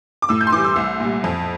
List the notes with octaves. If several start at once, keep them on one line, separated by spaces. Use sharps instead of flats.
D6
A2 E6
G6
C6
E3 G3 D6
E6
C2
A#2 G3
F2